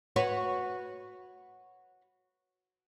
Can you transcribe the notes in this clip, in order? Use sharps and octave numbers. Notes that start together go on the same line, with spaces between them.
F#4 B4 C#5